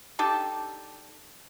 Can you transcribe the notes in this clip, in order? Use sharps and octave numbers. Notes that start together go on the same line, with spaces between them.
D4 D#4 G4 A4